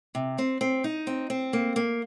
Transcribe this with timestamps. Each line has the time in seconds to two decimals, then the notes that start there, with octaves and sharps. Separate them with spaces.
0.15 C3
0.38 C4
0.61 C4
0.84 D#4
1.07 C4
1.30 C4
1.53 A#3
1.76 A#3